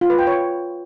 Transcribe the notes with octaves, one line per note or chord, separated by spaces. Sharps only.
F4
B4
G5
C#5